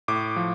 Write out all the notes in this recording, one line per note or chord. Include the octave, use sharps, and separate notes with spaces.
A2 D6
F3